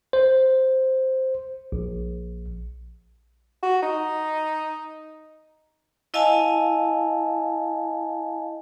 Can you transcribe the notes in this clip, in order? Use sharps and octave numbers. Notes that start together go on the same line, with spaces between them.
C5
A#1
F#4
D#4
E4 D#5 F5 G#5 A5